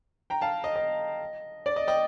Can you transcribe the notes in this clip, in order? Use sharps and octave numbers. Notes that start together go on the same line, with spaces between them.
G5 A#5
F5 A5
D#5
D#5
D5
D#5
D#5 G5